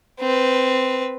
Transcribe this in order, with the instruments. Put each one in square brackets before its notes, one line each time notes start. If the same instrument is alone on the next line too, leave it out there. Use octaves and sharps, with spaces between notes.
[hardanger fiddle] C4 B4